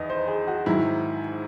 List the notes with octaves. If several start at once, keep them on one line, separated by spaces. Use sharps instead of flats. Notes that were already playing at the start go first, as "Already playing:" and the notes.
Already playing: E2 D#3 D#5
C5
G#4
F#4
G#2 D#3 F#3 E4